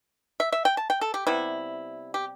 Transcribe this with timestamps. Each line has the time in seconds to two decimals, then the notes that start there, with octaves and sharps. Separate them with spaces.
0.40 E5
0.52 E5
0.65 G5
0.77 A5
0.90 G5
1.01 A4
1.14 G4
1.27 C3 G3 B3 E4
2.14 G4